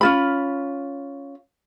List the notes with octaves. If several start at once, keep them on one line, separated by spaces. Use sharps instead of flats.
C#4 F4 B5